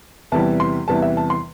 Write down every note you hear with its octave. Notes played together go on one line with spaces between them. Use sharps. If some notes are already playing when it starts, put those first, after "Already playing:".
E2 C3 E3 G3 A5
C6
E2 C3 E3 G3 A5
E5
A5
C6